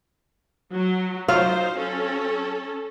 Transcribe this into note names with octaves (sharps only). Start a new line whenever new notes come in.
F#3
F#3 D#4 F4 C5 F5
C#4 A4